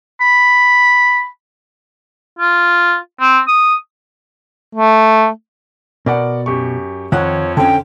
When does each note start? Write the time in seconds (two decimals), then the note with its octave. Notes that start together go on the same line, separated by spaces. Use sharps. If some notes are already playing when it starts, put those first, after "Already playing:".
0.21 B5
2.39 F4
3.20 C4
3.48 D#6
4.75 A3
6.06 B2 A#4 D5 F#5
6.46 F#2 G4 C#6
7.12 F2 D#3 C#5 F#5
7.57 D3 C#4 G5